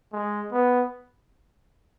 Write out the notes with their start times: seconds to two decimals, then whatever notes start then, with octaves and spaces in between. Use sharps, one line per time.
0.13 G#3
0.52 B3